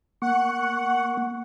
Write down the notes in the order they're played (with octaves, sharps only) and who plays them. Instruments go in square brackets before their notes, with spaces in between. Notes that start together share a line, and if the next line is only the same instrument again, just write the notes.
[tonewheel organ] A#3 C#6 [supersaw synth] F#5